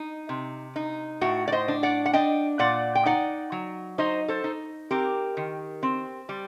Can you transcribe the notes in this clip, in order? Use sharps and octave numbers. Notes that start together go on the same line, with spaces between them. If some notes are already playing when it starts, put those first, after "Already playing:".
Already playing: D#4
C3
D#4
A2 F#4
D5
C5 D#5
D4
D5 F#5
F#5
D4 D#5 G5
A#2 D5 F#5
G5
D#4 D5 F#5
F#3
D#4 C5 D#5
A4 C5
D#4
C4 G4 A#4
D#3
C4
G3